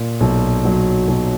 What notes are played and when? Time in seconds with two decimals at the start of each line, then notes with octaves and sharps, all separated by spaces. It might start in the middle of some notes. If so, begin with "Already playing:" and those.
Already playing: A#2
0.20 B1
0.65 F#3
1.08 B1